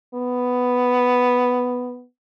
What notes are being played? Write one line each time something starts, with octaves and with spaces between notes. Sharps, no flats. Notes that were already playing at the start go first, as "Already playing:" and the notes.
B3